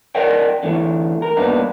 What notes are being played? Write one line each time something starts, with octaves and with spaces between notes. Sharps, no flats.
A#4 D5 D#5 F#5 G5
D3 E3 A3
A#4
G2 A#3 B3 D4 D#4